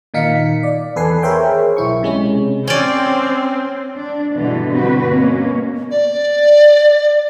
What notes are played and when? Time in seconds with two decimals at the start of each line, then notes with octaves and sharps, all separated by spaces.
0.14 A#2 D#3 D#4 F5 B6 C#7
0.63 D5
0.96 E2 A4 B4 G#5 C7
1.23 G#4 A#4 C5 C#5 E5 G5
1.77 B1 E4 C#6
2.03 C3 G#3 C#4
2.67 C4 C#4 D5
3.96 D4
4.36 G2 B2 D3 E3 G3 B3
4.72 G2 C4 F#4 B4
5.07 B2 A#3 C#4
5.91 D5